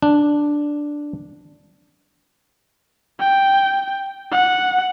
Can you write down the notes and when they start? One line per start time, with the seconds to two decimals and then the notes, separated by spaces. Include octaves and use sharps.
0.02 D4
3.20 G5
4.31 F#5